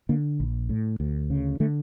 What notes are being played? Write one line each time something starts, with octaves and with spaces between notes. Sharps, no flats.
D3 A#3
A#1
A2
D2
C#3
D3 A3